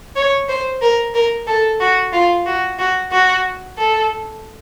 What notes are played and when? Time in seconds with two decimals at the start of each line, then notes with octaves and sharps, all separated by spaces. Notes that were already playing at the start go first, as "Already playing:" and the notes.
0.16 C#5
0.49 C5
0.82 A#4
1.14 A#4
1.47 A4
1.80 F#4
2.13 F4
2.46 F#4
2.79 F#4
3.12 F#4
3.78 A4